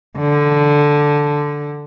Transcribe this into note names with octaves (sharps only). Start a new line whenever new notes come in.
D3